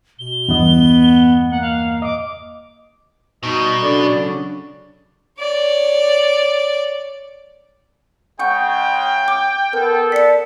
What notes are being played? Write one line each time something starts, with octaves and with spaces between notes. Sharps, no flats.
B2 G7
E2 G2 B3 D#5
A#3 F#5
F5
D#5 D6
B2 G3 D#4 D#5 C#6
C#3 F#3 D4 A4 D5
C#5 D5
C#3 G#3 F#5 G5 C#6 G6
D6
B3 A4 A#4
D5 B6 C#7